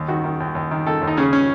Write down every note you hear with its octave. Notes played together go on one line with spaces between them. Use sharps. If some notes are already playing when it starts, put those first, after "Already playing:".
Already playing: D#2
D#3 F#4
D#3
D#2
D#2
D#3
D#3 A4
D#2
D#4
C#3 C#4
C#4